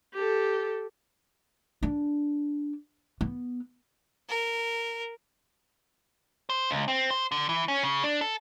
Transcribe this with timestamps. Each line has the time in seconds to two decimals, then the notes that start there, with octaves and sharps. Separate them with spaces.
0.14 G4 A4
1.83 D4
3.21 B3
4.29 A#4
6.50 C5
6.71 C#2
6.88 C4
7.11 C5
7.32 D3
7.49 E3
7.68 C#4
7.83 C#3
8.04 D4
8.21 A4